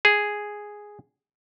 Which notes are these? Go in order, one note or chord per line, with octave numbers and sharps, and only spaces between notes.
G#4